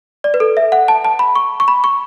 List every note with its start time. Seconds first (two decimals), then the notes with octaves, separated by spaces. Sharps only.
0.24 D5
0.34 B4
0.40 A4
0.57 E5
0.72 F#5
0.88 A5
1.05 A5
1.19 B5
1.36 C#6
1.60 C#6
1.68 B5
1.84 C#6